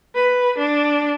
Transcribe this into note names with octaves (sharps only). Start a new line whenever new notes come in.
B4
D4